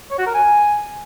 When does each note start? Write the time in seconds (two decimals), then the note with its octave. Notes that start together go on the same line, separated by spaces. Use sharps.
0.11 C#5
0.18 F#4
0.26 A#4
0.34 G#5